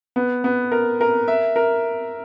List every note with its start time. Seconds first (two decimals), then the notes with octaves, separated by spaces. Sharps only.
0.16 B3
0.44 B3
0.72 A#4
1.01 A#4
1.28 E5
1.56 A#4